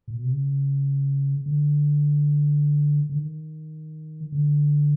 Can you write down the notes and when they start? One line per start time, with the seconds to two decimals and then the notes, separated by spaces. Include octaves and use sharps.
0.08 A#2
0.16 B2
0.24 C3
0.32 C#3
1.46 D3
3.10 D3
3.17 D#3
4.32 D3